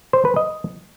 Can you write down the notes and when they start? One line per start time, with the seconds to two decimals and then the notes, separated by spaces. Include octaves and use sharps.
0.13 C5
0.25 B4
0.36 D#5